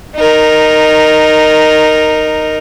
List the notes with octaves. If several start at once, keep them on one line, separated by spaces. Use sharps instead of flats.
D#4 A#4